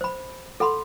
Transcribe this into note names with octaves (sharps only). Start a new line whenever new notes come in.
C5 B5
A4 F#5 B5 C6